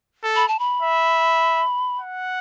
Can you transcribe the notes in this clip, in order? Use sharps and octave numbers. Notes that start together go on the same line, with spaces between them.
A4
B5
A5
B5
E5
F#5